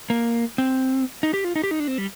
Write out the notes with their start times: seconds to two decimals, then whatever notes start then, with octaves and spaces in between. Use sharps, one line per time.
0.10 A#3
0.58 C4
1.23 D#4
1.34 G4
1.44 F4
1.56 D#4
1.63 G4
1.71 D#4
1.80 D4
1.88 C4
1.98 G3